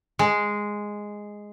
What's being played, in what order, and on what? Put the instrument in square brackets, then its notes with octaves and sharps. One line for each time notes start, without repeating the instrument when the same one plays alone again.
[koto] G#3